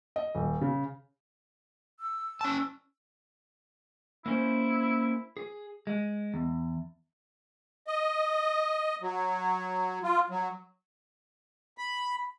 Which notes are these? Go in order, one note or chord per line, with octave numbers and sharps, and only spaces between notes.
D#5
D#1
C#3
E6
C#4 A5
A#3 C#4 E4 C5
G#4
G#3
E2
D#5
F#3
F4
F#3
B5